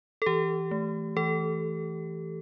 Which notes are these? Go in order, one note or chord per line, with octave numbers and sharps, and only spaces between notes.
A4
E3 G4
A3
E3 A4